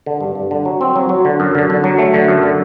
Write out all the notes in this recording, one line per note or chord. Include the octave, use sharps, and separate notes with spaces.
D3
G2
G2
D3
F#3
C4
F#3
F#3
D3
F#2
D3
D3
F#3
A3
D3
F#2
D3